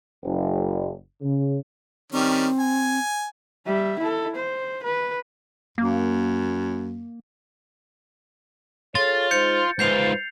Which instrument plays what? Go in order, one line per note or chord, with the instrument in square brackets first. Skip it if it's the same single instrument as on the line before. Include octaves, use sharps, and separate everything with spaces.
[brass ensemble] F#1
C#3
[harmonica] D#3 G3 C#4 [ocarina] C4
[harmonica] G#5
[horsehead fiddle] G3 E5
E4 A4
C5
B4
[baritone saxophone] F#2 [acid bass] A#3
[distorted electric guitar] F4 [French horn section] G#4 A4 C#5 [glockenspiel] A6
[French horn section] G#3 D#4 C5 [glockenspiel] G6 C#7
[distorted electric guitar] G#2 F4 [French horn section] D#4 B4 C5 [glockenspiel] G6 C7 F7